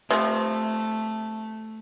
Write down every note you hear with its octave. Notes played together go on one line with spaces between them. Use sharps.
C3 F3 A3